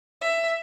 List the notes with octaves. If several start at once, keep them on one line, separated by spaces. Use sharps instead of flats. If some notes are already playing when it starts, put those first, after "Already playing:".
E5